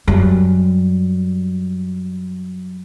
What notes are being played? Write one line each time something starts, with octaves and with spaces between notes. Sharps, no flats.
F#2 G3